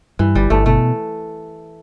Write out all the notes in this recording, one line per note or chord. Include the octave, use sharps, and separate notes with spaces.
G2 E3
G1 G3
G1 A3
B2 A3